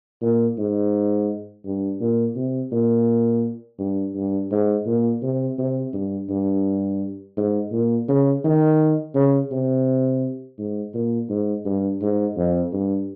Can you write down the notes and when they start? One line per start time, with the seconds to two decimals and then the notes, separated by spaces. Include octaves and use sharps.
0.22 A#2
0.58 G#2
1.66 G2
2.01 A#2
2.36 C3
2.72 A#2
3.79 G2
4.15 G2
4.51 G#2
4.87 A#2
5.23 C3
5.59 C3
5.94 G2
6.30 G2
7.37 G#2
7.72 A#2
8.09 C#3
8.44 D#3
9.15 C#3
9.52 C3
10.59 G#2
10.95 A#2
11.30 G#2
11.66 G2
12.02 G#2
12.37 F2
12.73 G2